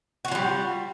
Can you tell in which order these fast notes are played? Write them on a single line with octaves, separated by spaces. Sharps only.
F#4 F4 F#3 G3